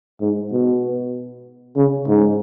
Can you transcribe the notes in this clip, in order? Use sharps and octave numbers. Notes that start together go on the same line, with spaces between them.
G#2
B2
C#3
G#2